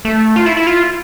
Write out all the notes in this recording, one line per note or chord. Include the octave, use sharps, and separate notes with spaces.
A3
F4
E4
E4
F4